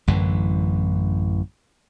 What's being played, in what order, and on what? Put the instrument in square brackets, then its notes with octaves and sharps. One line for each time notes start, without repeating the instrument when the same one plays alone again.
[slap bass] A1 F#2 D3 E3